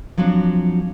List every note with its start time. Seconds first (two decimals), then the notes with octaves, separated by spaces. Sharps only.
0.18 F3 F#3 C4 D4